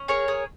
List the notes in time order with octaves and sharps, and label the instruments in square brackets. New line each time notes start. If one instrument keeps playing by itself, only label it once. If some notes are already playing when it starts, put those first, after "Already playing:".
Already playing: [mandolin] C#4
G#4 A#4 C#5
G#4